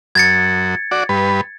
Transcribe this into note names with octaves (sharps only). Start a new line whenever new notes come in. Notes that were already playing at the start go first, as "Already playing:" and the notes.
F#2 G#6 A6 C#7
F#4 D5
G2 B4